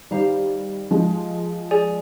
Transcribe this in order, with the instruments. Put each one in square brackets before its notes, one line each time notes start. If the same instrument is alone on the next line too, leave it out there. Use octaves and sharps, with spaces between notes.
[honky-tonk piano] D#3 G3 [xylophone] G4 C5 F5 A#5
[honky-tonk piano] F3 G#3
[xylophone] G#4 D5 G#5